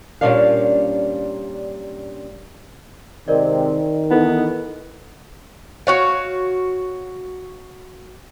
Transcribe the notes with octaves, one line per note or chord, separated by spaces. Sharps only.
A#2 G3 A3 C#4 D4 F5
C3 D#3 G#3 C4 A#4 D5 D#5
E3 B3 D#4 E4 A4
F#4 C#5 F5